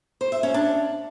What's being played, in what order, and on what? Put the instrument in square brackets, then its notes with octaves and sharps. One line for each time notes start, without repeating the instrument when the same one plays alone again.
[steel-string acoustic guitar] C5
E5
C#4
D4